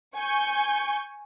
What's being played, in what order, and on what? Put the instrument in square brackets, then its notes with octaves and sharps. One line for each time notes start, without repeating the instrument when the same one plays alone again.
[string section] G#5 C#6 G6